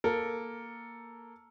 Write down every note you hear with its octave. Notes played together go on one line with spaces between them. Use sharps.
A#3 A4 A#4